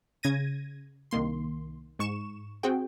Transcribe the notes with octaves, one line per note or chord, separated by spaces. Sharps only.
C#3 G#6 A#6 D#7
C2 D#3 A#3 C6
G#2 C#6 E7
C4 F#4 G#4 G5